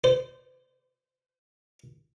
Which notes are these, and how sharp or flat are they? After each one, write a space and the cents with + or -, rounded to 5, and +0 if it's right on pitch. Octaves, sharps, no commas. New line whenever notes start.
C5 -30